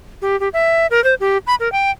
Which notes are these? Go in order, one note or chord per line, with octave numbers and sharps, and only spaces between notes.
G4
G4
E5
A#4
C5
G4
B5
A#4
G5